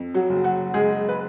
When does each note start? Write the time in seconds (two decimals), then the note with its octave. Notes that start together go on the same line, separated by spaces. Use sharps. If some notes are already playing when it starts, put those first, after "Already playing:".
Already playing: F2
0.14 F#3 F#4
0.30 F#1
0.44 F#3 F#4
0.74 F#1 G#3 G#4
1.09 B4